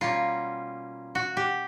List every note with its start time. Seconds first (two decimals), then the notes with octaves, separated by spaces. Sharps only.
0.01 B2 G3 A#3 C#4 F4
1.15 F#4
1.37 G4